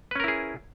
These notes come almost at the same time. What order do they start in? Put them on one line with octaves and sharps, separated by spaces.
B4 C#4 A#4 E4 G#4